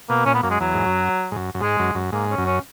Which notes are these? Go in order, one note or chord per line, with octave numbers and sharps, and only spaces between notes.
B2 A#3
A#2 C#4
B3
F#2 A#3
G#3
E2 F#3
G#2
F#2
G#2
F#2
F#2
G#2 G#3
F#2
F#2
G#2 A#3
C#4
F#2
C#4